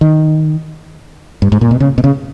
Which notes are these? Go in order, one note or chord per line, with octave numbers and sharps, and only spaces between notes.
D#3
G2
G#2
A#2
B2
C#3
B2
C#3